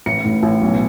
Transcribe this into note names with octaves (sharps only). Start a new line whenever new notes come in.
A1 C#7
A2
A1
B1